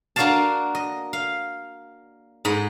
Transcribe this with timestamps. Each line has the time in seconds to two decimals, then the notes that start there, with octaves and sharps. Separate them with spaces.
0.16 A#3 D4 F#4 D5 F5 A5
0.75 D#5
1.13 F5
2.45 G#2 D#5 B5